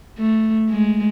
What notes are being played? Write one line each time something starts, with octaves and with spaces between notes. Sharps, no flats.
A3
G#3